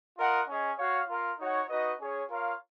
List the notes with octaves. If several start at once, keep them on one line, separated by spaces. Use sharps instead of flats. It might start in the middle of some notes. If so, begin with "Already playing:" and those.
F4 A#4 D#5 F#5
C#4 G#4 D#5
F#4 C#5 F5
F4 A#4 F5
D#4 F#4 C#5 F#5
D#4 F#4 B4 D#5
C#4 G#4 C#5
F4 A#4 C#5 F5